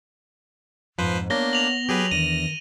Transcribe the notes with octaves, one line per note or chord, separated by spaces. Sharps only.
F2 G#2 F3 B4 C5
A#3 B3 D4 C#5 A#6 G7
A#6 F7 F#7
F#3 G4 G#4 B4
E2 D#3 D4 A#6 D#7